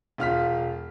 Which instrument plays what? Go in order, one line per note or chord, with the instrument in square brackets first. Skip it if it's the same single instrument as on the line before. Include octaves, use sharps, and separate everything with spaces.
[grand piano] E1 F4 F6 B6